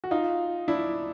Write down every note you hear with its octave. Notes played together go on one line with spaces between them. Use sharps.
F#4
D#4 F4
D4 E4